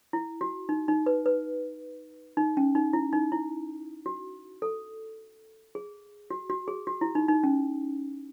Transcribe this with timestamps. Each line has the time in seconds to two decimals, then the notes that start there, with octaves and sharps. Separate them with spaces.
0.13 E4
0.41 F#4
0.69 D#4
0.88 D#4
1.06 B4
1.26 B4
2.37 D#4
2.57 C#4
2.75 D#4
2.93 E4
3.13 D#4
3.32 E4
4.06 F#4
4.62 A4
5.75 G#4
6.30 F#4
6.50 F#4
6.68 G#4
6.87 F#4
7.01 E4
7.15 D#4
7.29 D#4
7.43 C#4